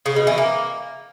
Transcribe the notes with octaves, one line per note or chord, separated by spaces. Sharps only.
C#3
B2
E3
A#3